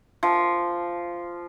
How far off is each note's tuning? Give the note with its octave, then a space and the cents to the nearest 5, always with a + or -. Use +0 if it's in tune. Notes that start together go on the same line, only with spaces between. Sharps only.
F3 -10